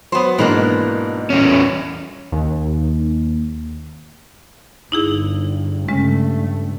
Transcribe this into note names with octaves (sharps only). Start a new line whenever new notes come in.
F#3 B3 C5
G#2 B2 E3 A#3 D4
E2 C#4
D#2
G1 D#4 E4 G#4
G2 C#3 G#3 A3 C#4